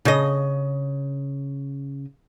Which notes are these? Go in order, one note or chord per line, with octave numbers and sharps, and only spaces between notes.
C#3 D#5